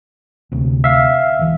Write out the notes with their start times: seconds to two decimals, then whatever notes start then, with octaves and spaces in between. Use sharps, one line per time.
0.52 D2 C3
0.84 E5 F5
1.39 E1 E3